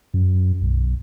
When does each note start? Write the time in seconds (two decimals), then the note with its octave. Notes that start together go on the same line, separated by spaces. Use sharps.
0.14 F#2
0.62 B1